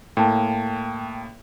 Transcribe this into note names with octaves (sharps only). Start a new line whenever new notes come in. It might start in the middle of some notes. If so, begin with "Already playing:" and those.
A2 A#3 G5 A5